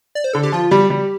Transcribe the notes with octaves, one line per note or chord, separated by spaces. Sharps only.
D5
C5
D3 A4
G4
F3 F4
G3 G4
G3